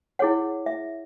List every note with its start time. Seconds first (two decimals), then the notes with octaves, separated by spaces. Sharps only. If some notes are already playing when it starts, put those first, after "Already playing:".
0.19 E4 G#4 C#5 F#5
0.66 E5